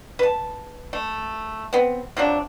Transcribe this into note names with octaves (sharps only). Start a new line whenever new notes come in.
B4 A5
A3
B3 C4
C3 F3 F#3 D4